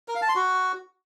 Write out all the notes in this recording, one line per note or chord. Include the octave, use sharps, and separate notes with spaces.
A#4
F5
A5
C6
F#4